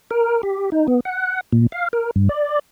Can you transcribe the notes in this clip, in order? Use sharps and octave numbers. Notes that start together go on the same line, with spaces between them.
A#4
G4
D#4
B3
F#5
A#2
F5
A#4
G2
D5